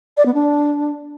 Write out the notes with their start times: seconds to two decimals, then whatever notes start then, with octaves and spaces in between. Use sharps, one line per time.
0.17 D5
0.26 B3
0.34 D4